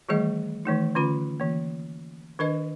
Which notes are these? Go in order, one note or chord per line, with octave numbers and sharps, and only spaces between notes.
D#3 E3 G3 A3 G#4 D#5
D#3 E3 A3 D#4
D3 C#4 F4 B5
E3 A#3
D#3 D4 A#4 B4 D#5